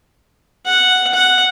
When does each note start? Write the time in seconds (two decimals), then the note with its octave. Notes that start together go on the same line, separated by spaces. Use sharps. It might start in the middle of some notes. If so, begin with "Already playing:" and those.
0.65 F#5
1.14 F#5